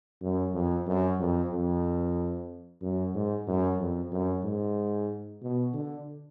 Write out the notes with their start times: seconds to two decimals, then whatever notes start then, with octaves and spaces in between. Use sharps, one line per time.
0.22 F#2
0.55 F2
0.87 F#2
1.19 F2
1.52 F2
2.82 F#2
3.14 G#2
3.48 F#2
3.79 F2
4.12 F#2
4.44 G#2
5.42 B2
5.74 D3